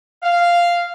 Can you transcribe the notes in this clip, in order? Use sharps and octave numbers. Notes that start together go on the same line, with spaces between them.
F5